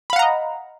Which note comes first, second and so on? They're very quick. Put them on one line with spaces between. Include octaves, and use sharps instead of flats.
B5 F5 F#5 A#5 D#5